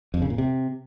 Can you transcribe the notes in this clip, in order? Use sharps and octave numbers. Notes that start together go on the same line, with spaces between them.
F2
C#3
A#2
C3